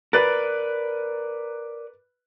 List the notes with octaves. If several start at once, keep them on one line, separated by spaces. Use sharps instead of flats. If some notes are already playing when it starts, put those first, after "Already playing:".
A#4 B4 D5 F#6 A6